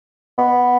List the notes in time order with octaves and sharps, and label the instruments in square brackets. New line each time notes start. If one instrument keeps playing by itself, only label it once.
[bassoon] B3